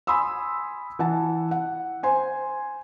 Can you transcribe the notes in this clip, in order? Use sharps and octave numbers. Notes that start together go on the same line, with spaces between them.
G#5 B5 C6 D#6 E6
E3 F#5 A5
F#5
C5 G#5 C6